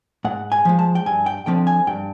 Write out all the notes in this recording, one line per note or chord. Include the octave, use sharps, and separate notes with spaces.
G#2 F#5
G#5
F3 G#3
A5
G5
G2 G#5
G5
D3 F3 A3 C4 G5
G#5
G2 G5